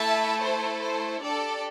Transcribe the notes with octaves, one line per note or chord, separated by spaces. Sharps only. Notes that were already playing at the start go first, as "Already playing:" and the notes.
Already playing: A3 E4 A4 E5 A5
C5
C5
D4 G4 A4 D5